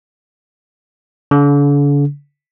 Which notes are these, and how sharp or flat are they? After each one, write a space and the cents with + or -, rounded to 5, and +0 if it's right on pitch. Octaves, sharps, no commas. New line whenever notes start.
D3 -45